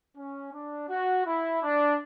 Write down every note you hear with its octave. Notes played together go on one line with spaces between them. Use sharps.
C#4
D4
F#4
E4
D4